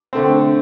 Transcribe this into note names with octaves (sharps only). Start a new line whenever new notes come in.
D3 A3 C4